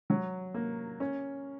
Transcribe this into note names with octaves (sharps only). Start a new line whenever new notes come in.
F#3
A#3
C#4